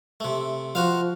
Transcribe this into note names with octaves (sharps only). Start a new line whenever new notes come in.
C3 A3
F3 F#4 C5 F5